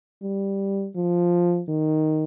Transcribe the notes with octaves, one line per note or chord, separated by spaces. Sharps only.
G3
F3
D#3